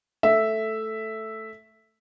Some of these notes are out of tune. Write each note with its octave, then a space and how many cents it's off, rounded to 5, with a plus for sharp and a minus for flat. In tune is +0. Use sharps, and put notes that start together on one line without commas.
A3 +0 E5 +0